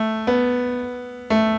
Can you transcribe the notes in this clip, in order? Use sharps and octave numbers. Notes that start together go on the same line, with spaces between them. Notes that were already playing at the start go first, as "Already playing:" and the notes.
Already playing: A3
B3
A3